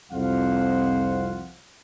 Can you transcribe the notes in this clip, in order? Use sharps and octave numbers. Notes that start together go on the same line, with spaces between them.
C2 F2 F3 C5 F5 F#5